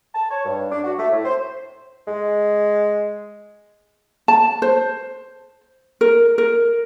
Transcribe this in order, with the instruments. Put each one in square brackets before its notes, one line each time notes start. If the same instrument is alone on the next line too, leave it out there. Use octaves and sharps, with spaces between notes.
[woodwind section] A5
C#5
G2
D4
F#4
A3
A2
C5
[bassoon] G#3
[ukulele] A5
C5
A#4
A#4